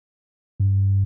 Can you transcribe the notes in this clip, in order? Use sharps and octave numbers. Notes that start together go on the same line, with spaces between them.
G2